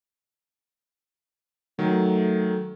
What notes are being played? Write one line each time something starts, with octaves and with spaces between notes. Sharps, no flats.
D#3 F#3 A3